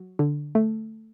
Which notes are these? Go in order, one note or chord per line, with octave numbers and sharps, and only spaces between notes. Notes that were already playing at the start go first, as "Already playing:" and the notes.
Already playing: F#3
D3
A3